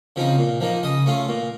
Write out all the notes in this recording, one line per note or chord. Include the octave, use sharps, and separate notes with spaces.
C#3 F3 C4 D#4
A#2
F3 A#3 D#4
C#3 D#5 D#6
A3 C#4 F4
A#2